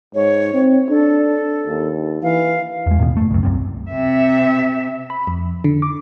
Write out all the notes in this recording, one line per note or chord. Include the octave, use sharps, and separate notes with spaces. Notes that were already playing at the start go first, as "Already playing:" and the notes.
G#2 C#5
C4
D4 A4
D#2
E3 F5
E2 G#3
A1 D#2 B2 B3
F#1 C#2 A3
C#2 F#2
C2 F#2 C3
C3 E5
B5
F2
D3
D6